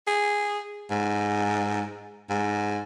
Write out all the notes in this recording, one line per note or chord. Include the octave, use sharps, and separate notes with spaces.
G#4
G#2
G#2